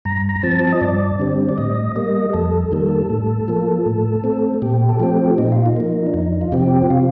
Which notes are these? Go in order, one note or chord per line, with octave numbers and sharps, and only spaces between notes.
G2 A#5
A#5
F3 C4 A5
D#5
G2 D5
D3 G3 C4
D5
A2 D#5
G3 A#3 D#5
F2 A4
D#3 G3 A#3
A2
F3 A#3
A2
A3 C4
A#2 G4
A4
F3 A3 C4 G4
A#2 D#4
F4
D#4
F3 A#3
D4
F2 D#4
F4
C3 F3 C4 G4
C3 F4